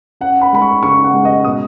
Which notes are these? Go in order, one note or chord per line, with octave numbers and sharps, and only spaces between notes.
C#4 F#5
B5
G#3 B5
C#6
C#3 C#6
F#5
G#3
D#5
B2 D#6